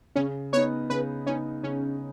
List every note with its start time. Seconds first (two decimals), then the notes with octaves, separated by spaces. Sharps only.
0.16 C#3 C#4
0.53 B3 D#4 C#5
0.90 C#3 B4
1.26 B3 C#4 D#4
1.63 C#3 C#4